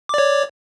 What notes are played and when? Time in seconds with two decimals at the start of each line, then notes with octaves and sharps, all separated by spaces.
0.09 D6
0.14 D5
0.18 C#5